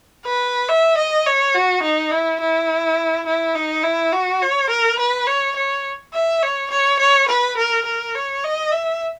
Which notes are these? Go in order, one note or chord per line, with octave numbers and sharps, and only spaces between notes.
B4
E5
D#5
C#5
F#4
D#4
E4
E4
E4
D#4
E4
F#4
C#5
A#4
B4
C#5
C#5
E5
C#5
C#5
C#5
B4
A#4
A#4
C#5
D#5
E5